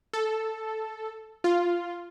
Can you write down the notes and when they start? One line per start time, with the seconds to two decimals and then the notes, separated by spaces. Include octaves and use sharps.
0.13 A4
1.44 F4